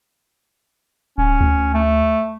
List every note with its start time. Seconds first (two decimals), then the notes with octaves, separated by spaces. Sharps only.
1.18 D1 C#4
1.40 D2
1.74 A3